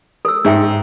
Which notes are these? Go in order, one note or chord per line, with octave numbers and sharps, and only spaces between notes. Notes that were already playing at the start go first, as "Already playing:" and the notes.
A4 E6
G#2 G#4 E5 G5